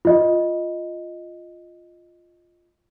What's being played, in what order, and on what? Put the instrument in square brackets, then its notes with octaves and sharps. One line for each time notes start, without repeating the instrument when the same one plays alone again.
[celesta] F4 D#5